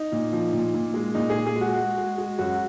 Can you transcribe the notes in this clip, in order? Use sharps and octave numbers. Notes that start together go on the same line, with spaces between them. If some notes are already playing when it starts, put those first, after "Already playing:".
Already playing: D#4
A#2
F3
A#2
A#2
G#3
A#2 D#4
G#4
A#2
G#4
G#3
F#4
G#3
G#3
G#3
F#2 F#4